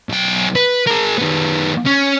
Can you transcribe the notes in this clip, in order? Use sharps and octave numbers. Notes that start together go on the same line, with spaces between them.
B1 G5
B4
G#4 A#4
D#3 B3
C#4